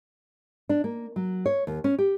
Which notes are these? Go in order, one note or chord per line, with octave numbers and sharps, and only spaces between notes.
D4
A#3
F#3
C#5
D#2
C#4
G4